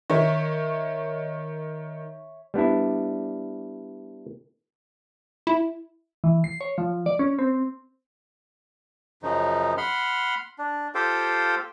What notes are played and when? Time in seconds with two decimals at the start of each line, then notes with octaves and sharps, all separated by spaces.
0.10 D#3 C#5 E5
2.54 G3 B3 D4 E4
5.47 E4
6.24 E3
6.44 C7
6.61 C#5
6.78 F3
7.06 D5
7.19 C#4
7.39 C4
9.23 F#2 C#3 F3 D#4
9.78 F#5 B5 C6 F6
10.59 D4
10.95 F4 G4 A4 C5 F5 G5